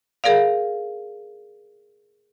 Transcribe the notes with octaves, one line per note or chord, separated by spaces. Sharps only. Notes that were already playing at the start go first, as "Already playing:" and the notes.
G#4 A#4 D5 F5